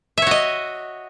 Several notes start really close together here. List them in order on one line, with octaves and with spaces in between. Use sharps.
E5 C#5 F#4 D#5